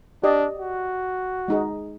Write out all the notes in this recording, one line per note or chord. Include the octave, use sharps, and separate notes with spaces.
D4 G4 D5 D#5
F#4
G#3 D#4 G#4